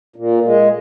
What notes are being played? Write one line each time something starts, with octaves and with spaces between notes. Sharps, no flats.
A#2
G#3